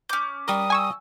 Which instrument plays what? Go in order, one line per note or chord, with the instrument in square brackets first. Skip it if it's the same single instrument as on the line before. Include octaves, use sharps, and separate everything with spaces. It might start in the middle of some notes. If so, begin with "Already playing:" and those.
[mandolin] C#4 D6 [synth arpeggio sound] G6
[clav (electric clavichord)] G3 A#4 [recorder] D#6
[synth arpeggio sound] G#5 C#6 E6